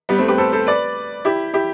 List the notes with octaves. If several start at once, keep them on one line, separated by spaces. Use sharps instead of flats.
G3 B3
A3 C4
G4 B4
A4 C5
A4 C5
B4 D5
E4 G4
E4 G4